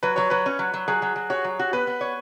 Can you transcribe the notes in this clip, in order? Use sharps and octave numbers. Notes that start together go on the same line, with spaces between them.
F#3 B4
F#3 C#5
F#3 B4
C#4
F#3
F#3
F#3 G#4
F#3
F#3
F#4 C#5
F#3
F#4
B3 B4
B3
C#5